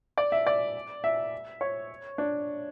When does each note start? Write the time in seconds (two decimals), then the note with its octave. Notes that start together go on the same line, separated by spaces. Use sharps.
0.18 D5
0.32 E5
0.47 D5
1.04 E5
1.61 C#5
2.18 D4